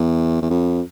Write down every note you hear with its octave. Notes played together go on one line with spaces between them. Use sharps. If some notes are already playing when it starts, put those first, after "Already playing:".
Already playing: E2
E2
F2